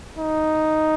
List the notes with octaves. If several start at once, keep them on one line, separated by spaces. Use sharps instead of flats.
D#4